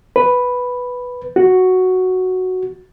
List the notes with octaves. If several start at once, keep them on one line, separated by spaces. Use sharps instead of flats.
B4
F#4